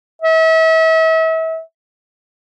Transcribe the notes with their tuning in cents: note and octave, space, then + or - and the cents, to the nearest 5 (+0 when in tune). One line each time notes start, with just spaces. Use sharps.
E5 -40